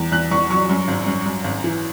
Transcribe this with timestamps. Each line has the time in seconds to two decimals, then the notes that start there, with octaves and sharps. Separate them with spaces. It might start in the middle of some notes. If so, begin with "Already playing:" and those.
Already playing: E2
0.12 E2 F#6
0.31 E2 C#6
0.50 F#3 C#6
0.69 F#2
0.88 G#1
1.07 F#2
1.26 F#2
1.44 G#1
1.64 E3